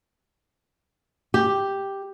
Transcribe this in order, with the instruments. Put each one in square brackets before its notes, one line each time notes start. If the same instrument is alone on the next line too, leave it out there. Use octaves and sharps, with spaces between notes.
[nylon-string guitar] G4